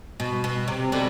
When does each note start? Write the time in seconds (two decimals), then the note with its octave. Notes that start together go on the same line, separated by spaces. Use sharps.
0.20 B2
0.44 B2
0.68 C3
0.92 B2 D3